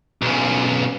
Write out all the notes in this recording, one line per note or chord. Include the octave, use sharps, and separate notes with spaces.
B1 C#3